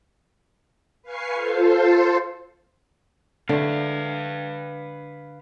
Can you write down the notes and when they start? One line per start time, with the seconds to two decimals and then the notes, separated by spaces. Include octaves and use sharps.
1.02 B4 F5 G#5 C#6 C7
1.34 F4 A4 C5
3.49 D3 A3 D4 B4 F5